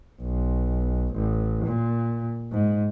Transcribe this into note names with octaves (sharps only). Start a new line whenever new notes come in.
B1
A1
A#2
G#2